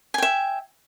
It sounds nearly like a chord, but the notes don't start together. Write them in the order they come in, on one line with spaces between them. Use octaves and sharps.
G#5 G5 E5